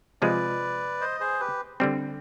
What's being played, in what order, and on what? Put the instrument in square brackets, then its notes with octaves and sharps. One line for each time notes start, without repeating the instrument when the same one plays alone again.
[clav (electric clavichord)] C3 F3 G#3 [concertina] B4 D5
[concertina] C5 D#5
G#4 C5
G4 B4
[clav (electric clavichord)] D3 G3 C4